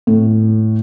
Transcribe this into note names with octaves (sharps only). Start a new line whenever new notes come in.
A2